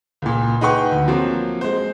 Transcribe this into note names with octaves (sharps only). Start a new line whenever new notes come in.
C#2 A#2
D#4 G#4 B4 F#5 G5 C#6
D2
F3 F#3 A#3 C4
G#3 C5